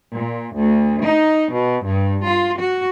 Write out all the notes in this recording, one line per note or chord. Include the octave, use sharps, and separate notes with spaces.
A#2
D2
D#4
B2
G2
F4
F#4